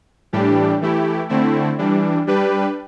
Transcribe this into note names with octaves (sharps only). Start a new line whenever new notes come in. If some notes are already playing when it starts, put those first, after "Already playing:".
A2 E3 G3 D4 G4
E3 A3 E4 G4
D3 A3 C4 E4
E3 G3 D4
G3 D4 G4 B4